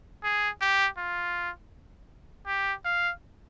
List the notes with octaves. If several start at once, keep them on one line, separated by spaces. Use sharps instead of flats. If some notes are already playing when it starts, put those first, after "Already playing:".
G#4
G4
F4
G4
F5